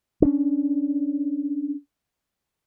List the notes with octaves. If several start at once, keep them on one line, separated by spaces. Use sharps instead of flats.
C#4 D4